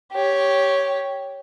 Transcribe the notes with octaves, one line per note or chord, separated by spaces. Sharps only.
G4 C#5